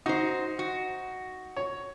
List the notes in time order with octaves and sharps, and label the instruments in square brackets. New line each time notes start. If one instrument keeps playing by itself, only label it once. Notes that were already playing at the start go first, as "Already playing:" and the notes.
[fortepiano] D#4 [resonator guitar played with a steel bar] F#4 C5
[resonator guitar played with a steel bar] F#4
[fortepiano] C#5